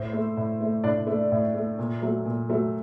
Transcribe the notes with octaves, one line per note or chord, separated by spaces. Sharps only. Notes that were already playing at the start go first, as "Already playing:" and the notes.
Already playing: A2 C5
A3
A2
A3
A2 D4 D5
A3
A2
A3
A#2
F#3 A3
A#2
F#3 A3